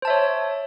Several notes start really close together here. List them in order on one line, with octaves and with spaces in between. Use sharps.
C5 A5 E5 C#5